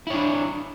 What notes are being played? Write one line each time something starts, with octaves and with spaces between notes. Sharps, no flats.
D4 E4 C#5